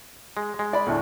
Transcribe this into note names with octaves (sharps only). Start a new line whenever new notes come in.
G#3
G#3
D5 B5
D2 A2 D4